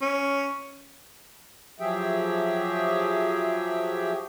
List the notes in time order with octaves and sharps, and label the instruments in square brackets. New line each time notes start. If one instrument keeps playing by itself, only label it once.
[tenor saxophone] C#4
[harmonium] F3 F#3 G4 G#4 E5 G5